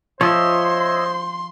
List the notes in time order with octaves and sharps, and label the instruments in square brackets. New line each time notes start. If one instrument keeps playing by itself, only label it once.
[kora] F3 [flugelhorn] C5 [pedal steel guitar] C#5 D#5 E5 [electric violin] C6